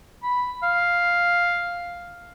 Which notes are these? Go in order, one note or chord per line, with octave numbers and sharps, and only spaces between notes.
B5
F5